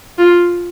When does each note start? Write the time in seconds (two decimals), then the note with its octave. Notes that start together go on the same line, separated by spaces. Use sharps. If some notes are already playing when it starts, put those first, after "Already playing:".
0.18 F4